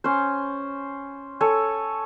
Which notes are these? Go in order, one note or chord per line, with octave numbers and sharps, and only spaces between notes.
C#4 C5
A4 C#5 G#5